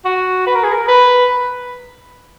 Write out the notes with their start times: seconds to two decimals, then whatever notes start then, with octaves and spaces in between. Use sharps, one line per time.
0.05 F#4
0.46 B4
0.55 A#4
0.64 G#4
0.72 A#4
0.88 B4